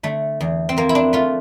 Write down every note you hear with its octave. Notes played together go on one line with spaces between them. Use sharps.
D3 A3
E2
C4
F3 A#3
E4
D4
A3 F4